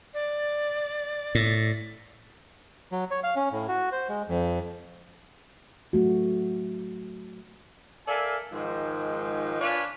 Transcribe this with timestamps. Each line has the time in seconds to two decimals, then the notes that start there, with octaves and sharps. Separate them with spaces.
0.14 D5
1.35 A2
2.92 F#3
3.11 C#5
3.23 F5
3.36 C#4
3.52 A2
3.68 F#4
3.92 C5
4.09 G#3
4.29 F2
5.93 F#3 A3 F#4
8.07 A4 A#4 D5 E5 F5 G#5
8.53 G#2 D#3 F3 G#3
9.60 D4 F4 B4 C#5 G#5